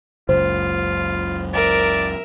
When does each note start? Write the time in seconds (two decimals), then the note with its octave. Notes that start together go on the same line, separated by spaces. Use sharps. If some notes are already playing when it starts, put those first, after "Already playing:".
0.29 F#1 C#2 F4 C5
1.54 A#4 D5 E5